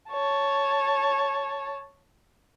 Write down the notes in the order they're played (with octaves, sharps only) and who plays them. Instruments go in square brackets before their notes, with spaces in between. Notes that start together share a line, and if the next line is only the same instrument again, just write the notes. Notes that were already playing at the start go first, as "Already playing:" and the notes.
[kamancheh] C#5 A5